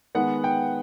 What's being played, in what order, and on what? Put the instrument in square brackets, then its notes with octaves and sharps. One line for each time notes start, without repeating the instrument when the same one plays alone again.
[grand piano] D#3 G#3 B3 F#5
G5